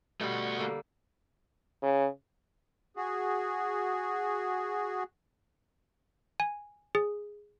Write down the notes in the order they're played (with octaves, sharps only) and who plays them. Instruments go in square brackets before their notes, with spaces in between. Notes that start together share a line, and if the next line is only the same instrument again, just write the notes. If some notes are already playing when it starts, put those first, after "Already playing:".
[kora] B2 G3 [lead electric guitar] A3 F#4
[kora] D3 G3 A#3
[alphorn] C#3
[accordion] F#4 G#4
[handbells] G#5
G#4